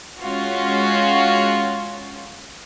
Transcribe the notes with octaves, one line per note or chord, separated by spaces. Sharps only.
G#3 C#4 F4 F#4